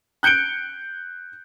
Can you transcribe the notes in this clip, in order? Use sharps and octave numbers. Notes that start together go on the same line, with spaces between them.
F#6 G6 C#7 D7 G7